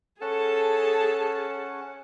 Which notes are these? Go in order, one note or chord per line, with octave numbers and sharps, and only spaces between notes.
C#4 G#4 A4 F#5 A5